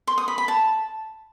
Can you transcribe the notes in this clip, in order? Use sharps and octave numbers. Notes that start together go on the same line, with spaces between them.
C6
D#6
B5
B5
A5